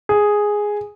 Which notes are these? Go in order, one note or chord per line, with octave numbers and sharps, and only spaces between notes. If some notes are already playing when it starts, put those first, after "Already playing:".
G#4